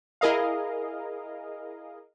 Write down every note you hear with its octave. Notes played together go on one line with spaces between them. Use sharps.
E4 G#4 A#4 D#5 F5